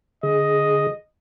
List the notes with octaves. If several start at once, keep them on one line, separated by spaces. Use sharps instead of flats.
D3 G#4 D#5